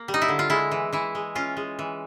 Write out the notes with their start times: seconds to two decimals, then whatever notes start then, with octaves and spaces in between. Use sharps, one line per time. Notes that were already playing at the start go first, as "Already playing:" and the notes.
Already playing: A#3
0.08 G3
0.14 D#4
0.22 E4
0.28 D3
0.39 F4
0.50 G#3 E4
0.71 E3
0.92 E3 E4
1.15 G#3
1.35 C#4 F4
1.57 G#3
1.79 E3